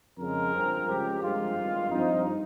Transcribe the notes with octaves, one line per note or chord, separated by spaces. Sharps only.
F2 C#3 G#3 A#4
G2 F3 C4
C#2 C#3 G#3 C4 G4
G2 F3 G#3 C4 F4
G#1 G2 D#3
G2 F3 C4 D#4